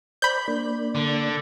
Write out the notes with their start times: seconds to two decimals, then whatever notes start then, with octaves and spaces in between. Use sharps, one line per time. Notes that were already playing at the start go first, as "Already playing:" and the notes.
0.22 C5 D5 B5 G6
0.48 A#3 D4 D5
0.96 D3